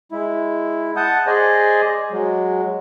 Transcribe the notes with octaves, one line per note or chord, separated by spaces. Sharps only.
G#3 E4
F#5 A5 D#6 G6
G#4 C5 D5 D#5 G#5
F#3 G#3